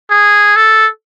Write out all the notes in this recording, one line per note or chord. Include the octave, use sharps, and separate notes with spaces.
G#4
A4